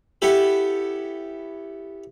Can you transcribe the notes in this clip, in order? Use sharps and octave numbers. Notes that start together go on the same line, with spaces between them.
B3 E4 G4 A4